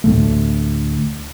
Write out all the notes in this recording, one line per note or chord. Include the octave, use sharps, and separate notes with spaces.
D2 A2 D3 A3